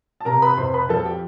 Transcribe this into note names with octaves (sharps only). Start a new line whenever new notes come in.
A5
C3 A#4 A#5
B4 B5
F2 C5 C6
B4 B5
F3 A4 A5
G4 G5